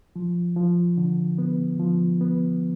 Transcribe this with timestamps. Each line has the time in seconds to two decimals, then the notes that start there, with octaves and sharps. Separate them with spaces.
0.16 F3
0.56 F3
0.97 D3
1.38 B3
1.80 F3
2.21 B3